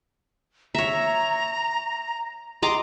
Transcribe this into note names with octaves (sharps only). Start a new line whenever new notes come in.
C#5 E5 A#5
D#5 A#5 C6 D6